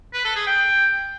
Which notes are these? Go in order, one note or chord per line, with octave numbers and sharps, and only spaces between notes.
B4
A4
G#4
G5